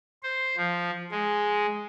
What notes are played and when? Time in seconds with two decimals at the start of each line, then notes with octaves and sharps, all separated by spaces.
0.23 C5
0.57 F3
1.12 G#3